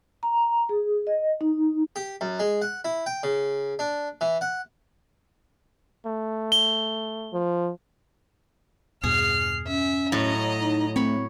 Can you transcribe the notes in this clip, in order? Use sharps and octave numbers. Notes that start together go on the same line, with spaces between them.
A#5
G#4
D#5
D#4
G4
F#2
G#3
F#5
E4
G5
C#3
D4
E3
F#5
A3
G7
F3
E2 G2 B2 G#4 F6 C7
C#4 E5
A2 F#3 D#5 A#5
D#4
A3 C4 C#5 B5